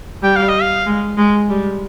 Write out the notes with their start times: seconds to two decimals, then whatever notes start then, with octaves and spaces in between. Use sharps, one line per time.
0.23 G3 G5
0.36 F5
0.49 D#5
0.62 F5
0.86 G#3
1.18 G#3
1.50 G3